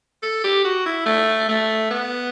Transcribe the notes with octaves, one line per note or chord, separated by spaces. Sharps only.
A4
G4
F#4
E4
A3
A3
B3